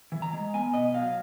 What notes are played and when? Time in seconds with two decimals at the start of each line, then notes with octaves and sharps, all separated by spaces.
0.12 E3
0.22 A#5
0.33 G#3
0.54 B3 G#5
0.74 B2 D#5
0.94 F#3 F5